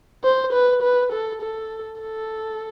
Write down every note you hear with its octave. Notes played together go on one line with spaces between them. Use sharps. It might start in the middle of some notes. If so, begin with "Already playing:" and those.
C5
B4
B4
A4
A4
A4